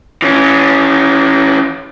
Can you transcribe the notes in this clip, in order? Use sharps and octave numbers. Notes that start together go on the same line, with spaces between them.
E3 C#4